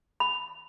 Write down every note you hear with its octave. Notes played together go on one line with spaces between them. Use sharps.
B5